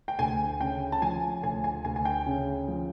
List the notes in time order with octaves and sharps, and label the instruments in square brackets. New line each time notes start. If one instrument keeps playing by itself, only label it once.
[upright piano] G5
D2 G#5
C#3 G5
A5
F3 G#5
D2 G#5
G#5
D2 G#5
G#5
G5
C#3
F3